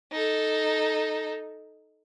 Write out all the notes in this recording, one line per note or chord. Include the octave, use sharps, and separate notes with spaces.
D#4 A4